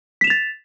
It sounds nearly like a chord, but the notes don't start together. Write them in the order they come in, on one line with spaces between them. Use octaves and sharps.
B6 E7 F7 A6